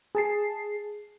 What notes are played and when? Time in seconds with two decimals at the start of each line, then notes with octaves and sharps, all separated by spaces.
0.15 G#4 A5 C7